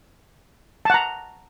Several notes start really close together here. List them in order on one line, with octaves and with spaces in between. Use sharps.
A5 F#5 A#5